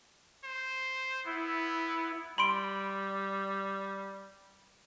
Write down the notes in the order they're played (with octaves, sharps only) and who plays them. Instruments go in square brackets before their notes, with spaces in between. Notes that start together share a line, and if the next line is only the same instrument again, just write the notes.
[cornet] C5
[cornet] B3 [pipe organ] E4
[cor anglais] G3 [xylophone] B5 C6 D7